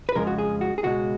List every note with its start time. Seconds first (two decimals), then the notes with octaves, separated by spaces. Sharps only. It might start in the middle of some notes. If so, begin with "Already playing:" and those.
0.09 B4
0.15 F2 C#3 F3 G#3 A#4
0.27 F#4
0.39 G#4
0.61 F#4
0.78 G#4
0.83 C#2 B2 G#3 F#4